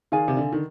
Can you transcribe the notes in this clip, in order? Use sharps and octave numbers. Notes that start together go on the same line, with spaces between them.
D#3 G#4 D5 F5 G#5
C3
D3
D#3